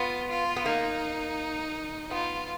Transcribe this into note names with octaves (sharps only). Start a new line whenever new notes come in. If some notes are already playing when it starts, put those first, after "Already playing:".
Already playing: B3 F4
F4
B3
A#3 D#4
B3 F4